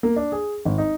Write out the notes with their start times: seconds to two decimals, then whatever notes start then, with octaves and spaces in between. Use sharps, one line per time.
0.03 A#3
0.16 D4
0.32 G#4
0.65 G#1
0.78 D#4